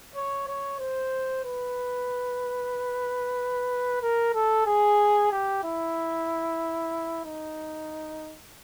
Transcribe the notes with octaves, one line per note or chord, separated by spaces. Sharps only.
C#5
C#5
C5
B4
A#4
A4
G#4
G4
E4
D#4